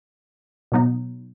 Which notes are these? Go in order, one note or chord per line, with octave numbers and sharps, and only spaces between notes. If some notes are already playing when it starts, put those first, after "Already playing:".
B2 F#3 B3 D#4